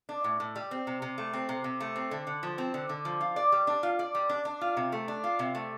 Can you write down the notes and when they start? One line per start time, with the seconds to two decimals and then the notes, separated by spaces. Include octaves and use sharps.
0.09 D4
0.24 A2
0.40 A2
0.56 G3
0.71 C4
0.87 C3
1.02 C3
1.18 A3
1.33 C4
1.49 C3
1.64 C3
1.80 A3
1.96 C4
2.11 D3
2.27 D3
2.43 F3
2.58 C4
2.74 D3
2.89 D3
3.05 F3
3.21 F4
3.36 D5
3.52 G3
3.67 D4
3.83 F4
3.99 D5
4.15 G3
4.29 D4
4.45 D4
4.61 F4
4.77 C3
4.92 A3
5.08 D4
5.24 F4
5.39 C3
5.55 A3